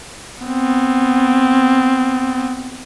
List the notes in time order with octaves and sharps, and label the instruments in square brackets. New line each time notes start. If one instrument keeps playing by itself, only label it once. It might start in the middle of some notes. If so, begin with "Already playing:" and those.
[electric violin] B3 C4